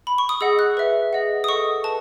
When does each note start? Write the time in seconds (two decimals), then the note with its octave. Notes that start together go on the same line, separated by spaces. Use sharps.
0.07 B5
0.18 C#6
0.29 D#6
0.41 G#4 D#5 F#5 E6
0.59 F#6
0.77 B4 E5
1.13 G#4 D#5 F#5
1.44 D#6
1.49 A4 D#5 F#5 C#6
1.84 B4 A5